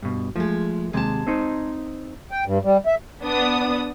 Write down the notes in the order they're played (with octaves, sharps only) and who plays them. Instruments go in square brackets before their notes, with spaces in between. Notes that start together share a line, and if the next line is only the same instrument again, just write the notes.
[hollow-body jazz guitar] G2 B2
[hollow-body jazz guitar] F3 [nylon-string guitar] G#3 A3
[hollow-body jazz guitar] D#2 C3 [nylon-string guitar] G#3 A5
[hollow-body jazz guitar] C4 D#4 C5
[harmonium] G5
G2
G3
E5
[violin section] B3 D4 D#6